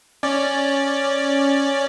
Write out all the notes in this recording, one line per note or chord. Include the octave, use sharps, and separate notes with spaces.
C#4 D5